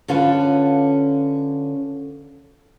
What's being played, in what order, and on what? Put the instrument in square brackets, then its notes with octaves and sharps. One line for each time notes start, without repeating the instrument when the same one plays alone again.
[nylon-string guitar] D3 C#4 F4 A4 B4